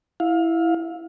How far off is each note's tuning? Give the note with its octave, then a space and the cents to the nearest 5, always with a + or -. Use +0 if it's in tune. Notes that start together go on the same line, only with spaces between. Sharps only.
E4 +0 F5 +25